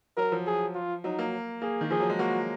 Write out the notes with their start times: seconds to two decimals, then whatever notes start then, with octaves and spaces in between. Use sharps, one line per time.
0.17 F#3 A#4
0.32 F3
0.47 G#4
0.75 F4
1.04 F#3 D#4
1.19 A#3
1.62 A#3 G#4
1.81 D#3
1.90 F3 G#4
2.00 F#3
2.09 G#3
2.19 A#3 F#4